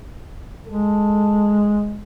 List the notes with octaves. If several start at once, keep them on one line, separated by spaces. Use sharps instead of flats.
G#3 A4